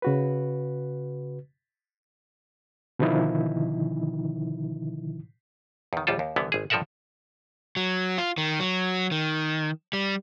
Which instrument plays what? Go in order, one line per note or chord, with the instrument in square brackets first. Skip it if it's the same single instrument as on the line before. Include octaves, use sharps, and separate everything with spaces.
[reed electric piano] C#3 F#4 B4
B2 D3 D#3 F3 D#4 E4
[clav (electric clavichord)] E2 D#3
A#1 D#2 G3 F4 A4
D#2
C2 D3 E3 B3
G#1 G#4
G2 F3 A4 A#4 E5 F#5
[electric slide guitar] F#3
F4
D#3
F#3
D#3
G3